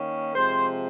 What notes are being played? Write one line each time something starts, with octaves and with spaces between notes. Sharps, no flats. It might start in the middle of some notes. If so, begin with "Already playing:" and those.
Already playing: D#3 A#3 C#4
C3 F3 G#3 C5